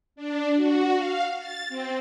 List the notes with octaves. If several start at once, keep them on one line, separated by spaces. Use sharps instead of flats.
D4
F#4
F5
A6
C4